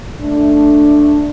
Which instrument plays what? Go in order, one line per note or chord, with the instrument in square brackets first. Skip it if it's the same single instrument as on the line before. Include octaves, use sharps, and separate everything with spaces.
[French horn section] A3 D4